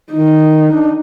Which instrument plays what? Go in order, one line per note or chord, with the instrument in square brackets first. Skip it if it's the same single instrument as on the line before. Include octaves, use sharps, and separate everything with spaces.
[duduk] D#3 [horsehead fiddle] D#4
[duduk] D4